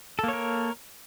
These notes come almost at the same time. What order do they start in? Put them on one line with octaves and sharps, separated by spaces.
A4 A#3 C#5 A#4